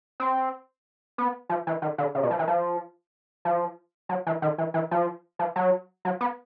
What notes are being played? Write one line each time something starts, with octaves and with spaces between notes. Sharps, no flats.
C4
B3
F3
E3
D#3
D3
C#3
B2
F3
E3
F3
F3
F#3
E3
D#3
E3
E3
F3
F3
F#3
F#3
B3